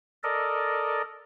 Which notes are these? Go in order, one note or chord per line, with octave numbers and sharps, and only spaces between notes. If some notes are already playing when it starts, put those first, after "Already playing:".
A4 A#4 D5 D#5